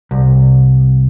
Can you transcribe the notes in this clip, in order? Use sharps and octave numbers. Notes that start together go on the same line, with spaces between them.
C2